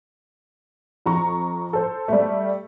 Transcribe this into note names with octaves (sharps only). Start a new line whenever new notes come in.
F2 A#5 C#6
A4 C5
G3 A3